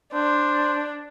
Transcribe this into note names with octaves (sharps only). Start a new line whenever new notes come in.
D4 C5